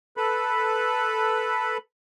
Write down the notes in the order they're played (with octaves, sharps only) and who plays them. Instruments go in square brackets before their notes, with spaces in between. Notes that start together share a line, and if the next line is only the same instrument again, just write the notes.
[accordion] A4 B4 B5